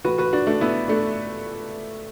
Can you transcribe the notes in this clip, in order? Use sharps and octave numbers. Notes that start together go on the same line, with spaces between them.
A2 E3 F#4 B4
F#4 B4
D4 F#4
A3 D4
B3 E4
A3 D4